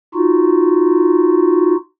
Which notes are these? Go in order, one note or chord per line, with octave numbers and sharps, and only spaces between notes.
D#4 F4 F#4